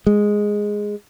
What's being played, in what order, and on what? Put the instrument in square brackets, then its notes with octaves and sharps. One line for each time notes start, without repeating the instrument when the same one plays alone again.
[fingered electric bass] G#3